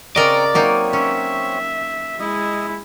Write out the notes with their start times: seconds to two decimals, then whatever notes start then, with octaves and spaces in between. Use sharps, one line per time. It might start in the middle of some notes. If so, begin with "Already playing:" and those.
0.16 C#3 C4 A#4 D5 D#5 A#5 C#6
0.54 F#3 A#3 C4 D#4 C#5
0.93 C#4 E5
2.19 G#3 E4 D#5 E5